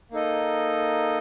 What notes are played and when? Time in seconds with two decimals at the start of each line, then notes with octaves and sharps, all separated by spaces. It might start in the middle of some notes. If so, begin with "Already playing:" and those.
0.11 A#3 D#4 A4 D#5